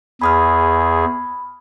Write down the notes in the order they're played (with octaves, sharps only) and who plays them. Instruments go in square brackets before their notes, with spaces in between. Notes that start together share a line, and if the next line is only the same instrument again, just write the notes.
[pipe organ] E2 G#4 [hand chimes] B5 D#6 F6